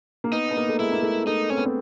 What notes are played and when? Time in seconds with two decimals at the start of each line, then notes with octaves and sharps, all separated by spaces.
0.24 A#3
0.33 B3 D#4
0.51 B3
0.57 A#3
0.69 A3
0.79 G#3 E4
0.92 A#3
1.03 A3
1.27 A3 D#4
1.50 C4 C#4
1.58 B3
1.65 C4